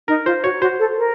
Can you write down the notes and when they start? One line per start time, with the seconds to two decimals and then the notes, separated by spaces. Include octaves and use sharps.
0.08 D#4 A#4
0.26 F4 C5
0.44 F#4 C#5
0.61 F#4 C5
0.79 A4
0.98 A#4